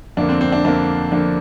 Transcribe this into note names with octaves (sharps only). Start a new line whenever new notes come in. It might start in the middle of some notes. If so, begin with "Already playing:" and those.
F2 D3 A#3 D4
C4
C4
D4
F2 D3 A#3 D4
F2 D3 A#3 D4